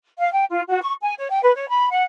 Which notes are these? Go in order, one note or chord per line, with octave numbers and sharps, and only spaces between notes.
F5
G5
F4
F#4
C#6
G#5
C#5
G5
B4
C#5
B5
F#5